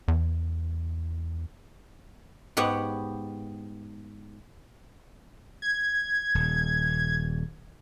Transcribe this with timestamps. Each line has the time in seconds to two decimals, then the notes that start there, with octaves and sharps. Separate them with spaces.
0.08 E2
2.57 G#2 B3 G4 C#5 F#5
5.62 G#6
6.35 D#1